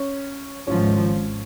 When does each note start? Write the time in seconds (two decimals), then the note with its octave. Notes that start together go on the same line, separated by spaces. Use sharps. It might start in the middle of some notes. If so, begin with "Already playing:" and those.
Already playing: C#4
0.67 G#1 G#2 F3 C#4